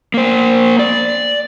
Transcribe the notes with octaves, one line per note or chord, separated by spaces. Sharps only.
A#3 C5
D5